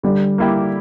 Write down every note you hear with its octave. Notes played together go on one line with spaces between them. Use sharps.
D3 G3
A#3 E4 G4